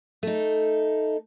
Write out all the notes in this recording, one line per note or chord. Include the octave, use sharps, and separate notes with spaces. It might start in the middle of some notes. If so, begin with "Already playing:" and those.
A3 D#4